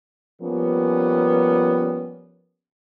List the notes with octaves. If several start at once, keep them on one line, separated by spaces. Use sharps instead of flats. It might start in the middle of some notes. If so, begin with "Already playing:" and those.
F3 G3 A#3 B3 C#4